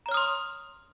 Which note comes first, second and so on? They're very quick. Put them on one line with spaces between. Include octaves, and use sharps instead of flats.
A#5 C#5 F6 D#6 C6